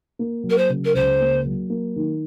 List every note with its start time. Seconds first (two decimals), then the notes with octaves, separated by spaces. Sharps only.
0.19 A#3
0.44 F#3
0.49 A#4
0.57 C5
0.69 C#3
0.84 A#4
0.94 C#2 C5
1.20 A#3
1.46 F#3
1.70 A#3
1.96 D#3